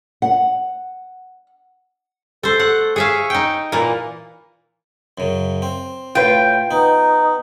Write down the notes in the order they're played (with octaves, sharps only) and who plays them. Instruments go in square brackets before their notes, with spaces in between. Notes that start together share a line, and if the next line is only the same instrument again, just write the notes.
[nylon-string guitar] F#5
[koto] A3 C5 [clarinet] A4
[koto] F#5
[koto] G#4 E5 F5 [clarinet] C#6
[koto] D#4 G5
A#2 E3 A#3
[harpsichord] F#2 C#3
C4
[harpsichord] A2 [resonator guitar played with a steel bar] F4 B4 [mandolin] G5
[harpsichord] B3 [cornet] D#4